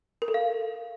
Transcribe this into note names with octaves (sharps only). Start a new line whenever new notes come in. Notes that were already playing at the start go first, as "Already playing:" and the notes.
A#4
A4
F5